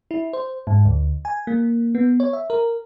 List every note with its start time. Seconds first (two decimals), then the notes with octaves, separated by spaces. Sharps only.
0.11 E4
0.33 C5
0.67 G#2
0.85 D2
1.25 G#5
1.47 A#3
1.95 B3
2.20 C#5
2.33 E5
2.50 A#4